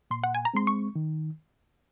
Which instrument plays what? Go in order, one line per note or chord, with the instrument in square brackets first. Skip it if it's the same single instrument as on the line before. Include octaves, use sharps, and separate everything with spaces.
[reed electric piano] A#2 [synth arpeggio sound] C6
[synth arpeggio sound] F#5
G#5
A#5
[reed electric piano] G#3 C4 [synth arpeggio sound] C6
[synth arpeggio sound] C#6
[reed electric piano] D#3